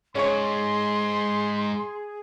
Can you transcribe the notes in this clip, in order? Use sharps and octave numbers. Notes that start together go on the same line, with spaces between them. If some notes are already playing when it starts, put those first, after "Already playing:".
G#2 C#4 G#4 C#5 C6